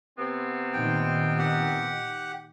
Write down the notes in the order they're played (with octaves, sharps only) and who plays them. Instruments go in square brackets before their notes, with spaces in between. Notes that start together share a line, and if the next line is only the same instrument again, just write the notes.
[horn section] C3 B3 C4
[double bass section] A#2 D#3 [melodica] G5
[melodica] G4 F#5